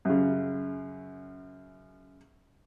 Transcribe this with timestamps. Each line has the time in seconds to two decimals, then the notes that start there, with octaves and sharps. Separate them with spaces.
0.05 F#2 C#3